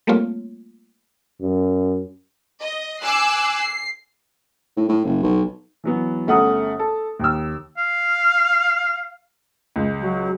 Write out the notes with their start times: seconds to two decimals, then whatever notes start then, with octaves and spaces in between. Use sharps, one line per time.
0.07 G3 A3 A#3 C4 F4 C#5
1.41 F#2
2.60 D#5
3.03 G#5 D6 E6 F#6 C7
3.58 C7
4.76 A2
4.89 A2
5.05 F#1
5.23 B1
5.84 E3 F#3 B3
6.27 G1 A3 C#4 F#5 A#5 D#6
6.79 A4
7.20 D#2 E6
7.77 F5
9.76 C#2
10.00 F#3